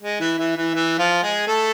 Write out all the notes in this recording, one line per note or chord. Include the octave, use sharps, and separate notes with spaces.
G#3
E3 E4
E3 E4
E3 E4
E3 E4
F3 F4
G#3 G#4
A3 A4